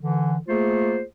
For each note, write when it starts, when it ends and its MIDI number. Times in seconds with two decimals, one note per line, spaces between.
0.01 0.36 50
0.01 0.36 52
0.48 1.02 57
0.48 1.02 58
0.48 1.02 65
0.48 1.02 68
0.48 1.02 72